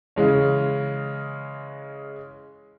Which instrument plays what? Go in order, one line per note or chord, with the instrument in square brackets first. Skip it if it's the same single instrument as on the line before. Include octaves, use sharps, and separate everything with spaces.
[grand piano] C#3 E3 G#3 C#4